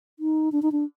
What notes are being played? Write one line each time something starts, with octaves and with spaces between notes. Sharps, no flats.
D#4
D4
D#4
D4